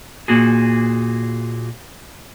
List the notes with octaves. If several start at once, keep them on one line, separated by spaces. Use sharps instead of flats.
A#2 A#3 F#4 G#4